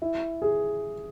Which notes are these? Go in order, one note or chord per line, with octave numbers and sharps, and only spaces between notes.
E4
G#4